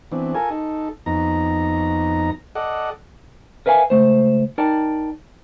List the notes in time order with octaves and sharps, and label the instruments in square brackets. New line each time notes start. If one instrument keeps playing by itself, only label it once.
[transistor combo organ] E3 B3 C4 D4
F4 A4 A#4 G#5
D#4 A4
F2 B3 D#4 A#5
A4 D5 D#5 F#5
[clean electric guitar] A#4 B4 E5 F5 G#5
C#2 D#3 A3 C5
D#4 A#4 D5 G5 A5